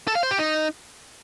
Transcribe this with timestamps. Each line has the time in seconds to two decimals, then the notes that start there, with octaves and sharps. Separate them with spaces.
0.08 A4
0.15 F5
0.23 C5
0.31 G4
0.39 D#4